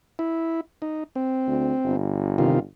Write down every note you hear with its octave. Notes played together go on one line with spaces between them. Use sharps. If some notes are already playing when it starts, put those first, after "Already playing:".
E4
D#4
C4
D2
G1
C3 D#3 F4